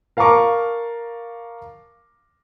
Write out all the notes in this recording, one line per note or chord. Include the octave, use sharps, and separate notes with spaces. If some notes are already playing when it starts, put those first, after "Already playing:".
A#4 F5 A5 A#5 C#6 D6